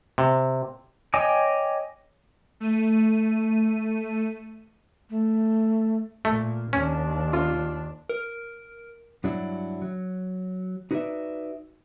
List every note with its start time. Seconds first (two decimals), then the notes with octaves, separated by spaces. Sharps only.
0.18 C3
1.14 C#5 D#5 G5 G#5 D6
2.60 A3 D#7
5.10 A3
6.25 A#2 A3
6.73 D#2 C#4 D4
7.33 F4
8.09 A#4
9.24 G2 F#3 D4 E4 F#4
9.82 F#3
10.91 D#4 F#4 B4 C5 D5 E5